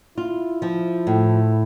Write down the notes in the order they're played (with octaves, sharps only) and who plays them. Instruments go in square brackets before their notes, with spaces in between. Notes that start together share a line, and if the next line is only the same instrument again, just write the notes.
[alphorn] E4 [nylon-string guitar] F4
[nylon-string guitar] F3
A2